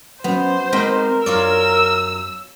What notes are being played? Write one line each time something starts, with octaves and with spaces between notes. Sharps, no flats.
F#3 B3 C#4 C5
G#3 C4 A#4 B4 D#5 G5
F#2 F4 C#5 D5 E6